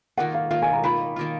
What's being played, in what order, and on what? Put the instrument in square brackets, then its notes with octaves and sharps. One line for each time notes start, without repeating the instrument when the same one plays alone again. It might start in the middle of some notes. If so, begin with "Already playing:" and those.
[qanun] D#3 A#3 F4 [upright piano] F#5
[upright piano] F5
[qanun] D#3 A#3 F4 [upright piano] F5
[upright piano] G#5
A#5
[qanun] D#3 A#3 F4 [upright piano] B5
[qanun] D#3 A#3 F4